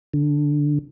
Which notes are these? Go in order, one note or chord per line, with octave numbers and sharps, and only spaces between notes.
D3